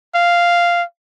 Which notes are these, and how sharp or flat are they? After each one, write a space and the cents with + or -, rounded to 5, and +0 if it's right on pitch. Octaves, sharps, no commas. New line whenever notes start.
F5 -5